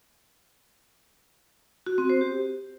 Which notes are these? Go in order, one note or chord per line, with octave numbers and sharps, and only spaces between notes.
F#4
C4
C5
G4